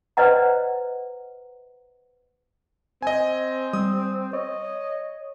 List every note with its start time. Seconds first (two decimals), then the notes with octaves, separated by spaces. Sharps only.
0.17 B4 C5 D5 D#5 F#5 A#5
3.02 C4 D#5 G#5
3.73 G3 D#6
4.33 C#5 D#5